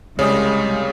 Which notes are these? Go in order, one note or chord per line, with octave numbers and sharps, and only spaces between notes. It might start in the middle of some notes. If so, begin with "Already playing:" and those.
C2 C#3 G3 G#3 C#5 D#6